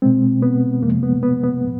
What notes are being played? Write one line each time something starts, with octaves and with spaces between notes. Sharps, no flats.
B2 G#3 C4
B3
F2 C3 F3 G#3 A#3
B3
B3
B3
A2 F3